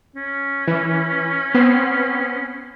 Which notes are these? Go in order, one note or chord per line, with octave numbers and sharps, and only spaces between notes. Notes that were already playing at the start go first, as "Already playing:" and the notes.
C#4
E3
B3 C4 C7